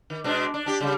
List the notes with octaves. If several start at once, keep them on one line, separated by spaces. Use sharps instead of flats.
D#3
B2 G#3 D4
D4
D4 G4
C#3 G3